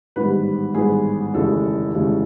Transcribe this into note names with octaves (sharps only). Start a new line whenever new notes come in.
A1 G#2 D#3 G3 B3 B4
A1 G#2 D#3 G3 B3 G#4
F1 D#2 C#3 E3 G#3 A4
F1 D#2 C#3 E3 G#3